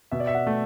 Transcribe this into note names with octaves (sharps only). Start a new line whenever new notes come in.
B2 E5
D5
E5
F#5
A3